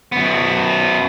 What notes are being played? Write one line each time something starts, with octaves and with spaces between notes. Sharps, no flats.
F#2 B3